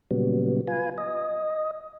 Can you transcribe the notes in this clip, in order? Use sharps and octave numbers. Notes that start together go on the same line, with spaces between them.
A#2 C#3 F#3 G3 B3
F4 B4 G#5
D#5